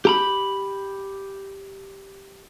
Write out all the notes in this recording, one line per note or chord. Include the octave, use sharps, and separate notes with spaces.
G4 A#5 B5